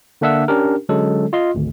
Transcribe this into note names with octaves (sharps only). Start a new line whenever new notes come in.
D3 A#3 D4 E5 F#5 E6
C#4 D4 G4 A#4
D3 F#3 G#3 C#4 A4
F4 D#5 C6
G#1 D2